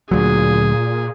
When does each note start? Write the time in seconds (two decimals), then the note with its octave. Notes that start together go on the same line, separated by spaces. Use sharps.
0.11 D2 A#2 F#3 G#4